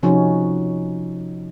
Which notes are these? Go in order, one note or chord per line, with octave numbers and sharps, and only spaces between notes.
C3 F3 C#4 D#4 F#4